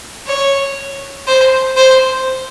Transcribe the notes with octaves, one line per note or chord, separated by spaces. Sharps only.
C#5
C5
C5